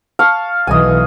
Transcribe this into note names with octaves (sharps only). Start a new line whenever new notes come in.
F5 A5 C#6
B1 E3 D#5 G#5